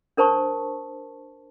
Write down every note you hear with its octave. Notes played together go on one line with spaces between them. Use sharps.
D4 A#4 C5 A5 C#6